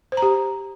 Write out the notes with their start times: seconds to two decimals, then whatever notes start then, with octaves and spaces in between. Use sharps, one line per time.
0.12 C5
0.17 A#5
0.22 G4